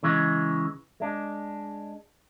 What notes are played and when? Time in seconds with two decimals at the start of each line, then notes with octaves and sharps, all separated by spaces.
0.03 C#3 E3 G#3
1.00 G#3 D4